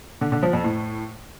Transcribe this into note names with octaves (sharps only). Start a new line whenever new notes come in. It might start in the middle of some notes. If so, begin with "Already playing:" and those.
D3
D3
F3
F2
A2